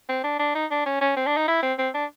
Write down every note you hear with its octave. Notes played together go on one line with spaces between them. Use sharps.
C4
D4
D4
D#4
D4
C#4
C#4
C4
D4
D#4
E4
C4
C4
D4